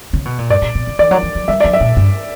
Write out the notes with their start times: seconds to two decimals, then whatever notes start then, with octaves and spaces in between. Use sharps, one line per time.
0.13 C#3
0.25 B2
0.38 A#2
0.50 G2 D5
0.62 A#2
0.75 B2
0.87 C#3
0.99 E3 D5
1.11 F#3
1.23 E3
1.35 F#3
1.48 G3 E5
1.60 F#3 D5
1.73 E5
1.81 A#2
1.97 G2